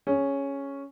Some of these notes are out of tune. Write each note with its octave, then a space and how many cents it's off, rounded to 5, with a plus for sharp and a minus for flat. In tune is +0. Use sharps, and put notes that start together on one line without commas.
C#4 +0 G#4 +0